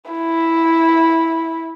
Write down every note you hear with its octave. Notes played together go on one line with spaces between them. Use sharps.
E4